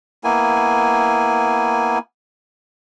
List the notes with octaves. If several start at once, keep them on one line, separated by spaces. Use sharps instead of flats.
A#3 B3 E4 G#5